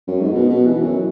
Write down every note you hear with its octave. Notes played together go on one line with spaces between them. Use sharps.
F#2
G#2
B2
B2
E3
F#2